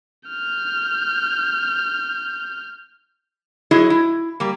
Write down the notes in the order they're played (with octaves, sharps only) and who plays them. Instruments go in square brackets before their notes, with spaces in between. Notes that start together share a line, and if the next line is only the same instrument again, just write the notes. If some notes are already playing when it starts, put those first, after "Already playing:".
[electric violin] F6 G6
[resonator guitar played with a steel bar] F#3 E4 G#4 D#5
E4
G3 A#3